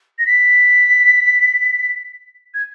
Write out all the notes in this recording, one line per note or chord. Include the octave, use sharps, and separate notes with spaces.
A#6
B6
G#6